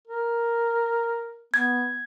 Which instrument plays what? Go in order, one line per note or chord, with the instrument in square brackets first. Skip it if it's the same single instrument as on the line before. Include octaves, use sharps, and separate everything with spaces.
[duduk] A#4
[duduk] B3 [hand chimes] G#6